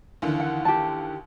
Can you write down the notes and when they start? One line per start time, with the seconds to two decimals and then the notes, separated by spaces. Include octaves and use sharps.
0.22 D#2 D3 E3
0.40 F#5
0.65 G4 A5